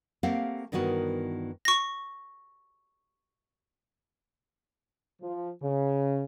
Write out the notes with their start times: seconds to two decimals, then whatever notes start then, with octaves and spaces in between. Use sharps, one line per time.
0.23 A3 A#3 C4 G4 F5 F#5
0.72 G2 D#3 E3 B3 F#4 A#4
1.65 C#6 A#6
5.22 F3
5.62 C#3